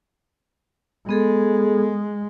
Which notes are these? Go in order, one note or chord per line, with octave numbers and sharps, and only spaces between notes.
G#3 B3 G#4 A4